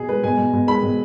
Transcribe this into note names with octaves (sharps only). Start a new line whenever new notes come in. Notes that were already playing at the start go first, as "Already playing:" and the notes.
Already playing: B2 G#4
G#3 B4
B2 G#5
B2
B2
G#3 B5
B2